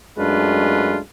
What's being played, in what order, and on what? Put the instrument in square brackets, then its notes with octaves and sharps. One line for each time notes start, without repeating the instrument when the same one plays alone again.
[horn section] F#2 G#3 A3 D4 F4 B4